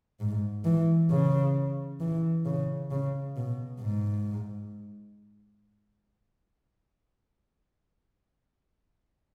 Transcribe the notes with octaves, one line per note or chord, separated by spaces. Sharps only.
G#2
E3
C#3
E3
C#3
C#3
B2
G#2